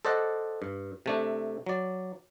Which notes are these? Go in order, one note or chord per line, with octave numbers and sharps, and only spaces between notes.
A4 C5 D5 D#5 F#5
G2
C3 A3 D4
F#3 D5